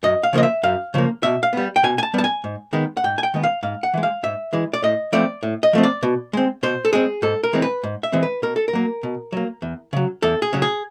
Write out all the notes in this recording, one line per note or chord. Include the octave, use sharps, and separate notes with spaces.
F#2 D#5
F5
C#3 F3 A#3 D#5
E5
F#2 F5
C#3 F3 A#3
B2 E5
F5
G3 B3
G5
B2 G#5
G#5
A5
G3 B3 A5
G#5
G#2
D#3 G#3 B3
F#5
G#2 G5
G#5
G5
D#3 G#3 B3
F5
G#2 F5
F#5
E3 G#3
F5
G#2 E5
E3 G#3
D5
A2 D#5
F3 A3 C4 D5
A2
D#5
F3 A3 C4
D5
B2
G#3 C4
B2 C5
A4
G#3 C4 G#4
G#2 A4
A#4
E3 G#3 C4
B4
G#2
E5
E3 G#3 C4
B4
B2 A#4
A4
A#4
F#3 A#3
B2
F#3 A#3
E2
C#3 F#3
E2 A4
G#4
C#3 F#3
G#4